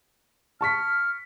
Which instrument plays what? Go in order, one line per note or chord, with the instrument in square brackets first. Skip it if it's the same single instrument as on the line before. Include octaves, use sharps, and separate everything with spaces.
[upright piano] A5 C#6 B6 [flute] F6